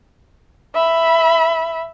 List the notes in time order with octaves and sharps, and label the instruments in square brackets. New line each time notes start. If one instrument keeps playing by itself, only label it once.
[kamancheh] E5 B5